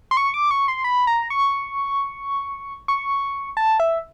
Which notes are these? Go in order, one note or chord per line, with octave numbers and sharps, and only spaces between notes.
C6
C#6
D6
C#6
C6
B5
A#5
C#6
C#6
A5
E5